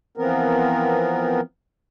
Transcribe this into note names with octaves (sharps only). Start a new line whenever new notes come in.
E3 F3 B3 C4 A#4